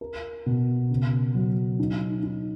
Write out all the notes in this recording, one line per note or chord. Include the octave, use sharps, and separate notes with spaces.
A#4
B2
C#3
F#3
D#4
D#4